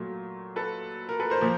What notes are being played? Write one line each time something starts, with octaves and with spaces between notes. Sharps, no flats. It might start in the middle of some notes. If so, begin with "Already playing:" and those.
Already playing: A#2 F#3 A3
A4 B4
A#4
A4 B4
A#4 C5
A#2 F3 A#3